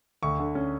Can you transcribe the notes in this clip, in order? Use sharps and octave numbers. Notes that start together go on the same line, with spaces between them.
D2 C#6
D3
C#4